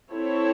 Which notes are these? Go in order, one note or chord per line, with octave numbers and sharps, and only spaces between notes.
C4 E4 A4 C#5